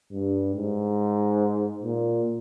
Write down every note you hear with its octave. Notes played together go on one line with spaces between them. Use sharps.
G2
G#2
A#2